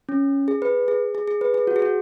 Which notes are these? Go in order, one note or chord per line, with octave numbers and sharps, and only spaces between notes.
C#4
G#4
B4
G#4
G#4
G#4
B4
G#4
F#4
G#4
F#4